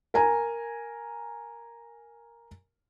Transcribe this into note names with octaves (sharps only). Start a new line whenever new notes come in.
A#4 G#5 A#5